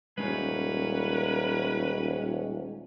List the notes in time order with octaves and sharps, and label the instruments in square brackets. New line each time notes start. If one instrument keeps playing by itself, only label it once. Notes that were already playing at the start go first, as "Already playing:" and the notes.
[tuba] D#1 [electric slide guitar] G#3 C#4 G4 [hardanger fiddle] A#4 C#5 [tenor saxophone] B4